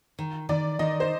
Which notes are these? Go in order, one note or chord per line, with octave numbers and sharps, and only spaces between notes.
D#3
D#3 D5
D#3 D#5
C5